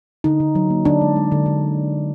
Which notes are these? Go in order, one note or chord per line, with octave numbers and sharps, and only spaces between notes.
D3 D#4
D3
F#3
A#3
D3 D4
G#3
G#3
D3
D3